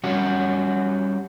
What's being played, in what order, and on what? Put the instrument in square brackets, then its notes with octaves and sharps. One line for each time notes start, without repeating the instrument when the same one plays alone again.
[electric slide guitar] G3 C#4 F#4